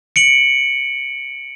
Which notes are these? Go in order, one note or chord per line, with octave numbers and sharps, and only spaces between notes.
C#7 D7 F#7